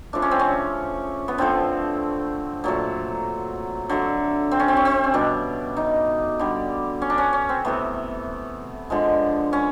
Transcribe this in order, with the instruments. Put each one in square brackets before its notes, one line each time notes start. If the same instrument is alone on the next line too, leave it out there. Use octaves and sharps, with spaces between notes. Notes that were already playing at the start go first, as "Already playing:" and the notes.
[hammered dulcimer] C#3 F3 A3 D4
C#4
C4
C#4
B3
D3 F3 A3 C4
A#2 F#3 A3
D3 F#3 A3
C4
C#4
C4
C#4
C4
C#4
B2 G3 D4
D#4
D3 G3
C#4
D4
C#4
C#4
C4
C3 E3 A3 B3
D3 F3 G#3
C#4